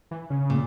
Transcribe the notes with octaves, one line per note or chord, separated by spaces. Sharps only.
E3
C#3
A#2